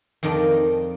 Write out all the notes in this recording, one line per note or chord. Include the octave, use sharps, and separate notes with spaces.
F2 D#3 A#4 D5 D#5